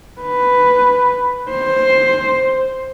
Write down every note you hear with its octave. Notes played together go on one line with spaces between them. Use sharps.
B4
C5